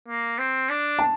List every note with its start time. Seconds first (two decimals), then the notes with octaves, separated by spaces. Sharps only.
0.08 A#3
0.39 C4
0.69 D4
0.99 A5